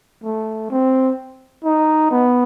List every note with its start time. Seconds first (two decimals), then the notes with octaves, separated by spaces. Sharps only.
0.23 A3
0.70 C4
1.65 D#4
2.11 B3